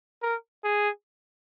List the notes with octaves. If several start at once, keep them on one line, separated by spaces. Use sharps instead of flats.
A#4
G#4